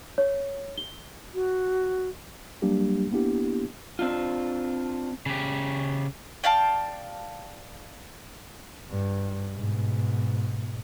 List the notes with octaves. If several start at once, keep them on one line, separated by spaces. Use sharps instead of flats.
C#5
G7
F#4
F#3 G3 A#3 D4 G4
A#3 B3 D4 E4 G4
C4 D4 F4
C#3 G4
D5 F5 G5 A5
G2
G#2 B2